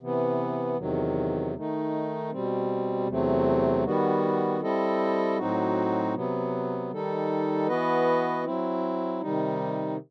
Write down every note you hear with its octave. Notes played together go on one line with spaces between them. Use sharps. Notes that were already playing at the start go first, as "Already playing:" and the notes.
C3 E3 B3
E2 C3 D#3 F#3
D#3 A3 D#4
B2 G3 C4
E2 C3 F#3 A3 C4
D#3 G3 B3 F#4
G3 C4 E4 A4 D#5
A2 F#3 C4 D#4 F#4
C3 F#3 B3
D#3 G3 D#4 A4
E3 B3 F#4 B4 D#5
F#3 C4 E4
C3 D#3 G3 D#4